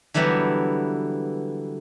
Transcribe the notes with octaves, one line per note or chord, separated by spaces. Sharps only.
D3 E3 F#3 G3 B3